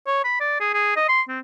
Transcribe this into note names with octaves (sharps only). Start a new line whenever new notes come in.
C#5
B5
D5
G#4
G#4
D#5
C6
C4